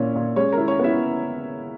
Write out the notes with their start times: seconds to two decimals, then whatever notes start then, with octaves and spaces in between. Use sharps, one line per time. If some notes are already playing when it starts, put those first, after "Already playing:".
Already playing: A#2 C#4 E4 C#5
0.15 A#2
0.36 G#3 C#4 C#5
0.53 A#4
0.58 E4
0.68 C#4 C#5
0.79 B3 E4 E5